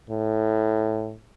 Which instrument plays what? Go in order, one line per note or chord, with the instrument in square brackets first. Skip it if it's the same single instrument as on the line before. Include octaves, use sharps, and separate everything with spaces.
[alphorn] A2